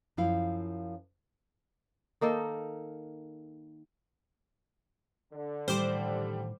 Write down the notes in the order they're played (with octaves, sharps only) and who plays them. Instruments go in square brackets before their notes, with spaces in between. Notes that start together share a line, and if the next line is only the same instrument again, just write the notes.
[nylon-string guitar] F#2 F3 E4 F5
[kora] D#3 A#3 D#4 A4
[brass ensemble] D3
[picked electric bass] A2 D#3 E3 [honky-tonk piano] G3 [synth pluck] C5 D6